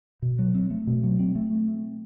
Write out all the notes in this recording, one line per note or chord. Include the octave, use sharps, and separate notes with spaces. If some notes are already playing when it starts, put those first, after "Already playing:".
B2
F#3
C4
A3
B2
F#3
C4
A3